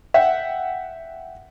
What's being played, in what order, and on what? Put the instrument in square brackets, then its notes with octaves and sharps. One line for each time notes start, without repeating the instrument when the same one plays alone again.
[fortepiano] E5 F#5 G5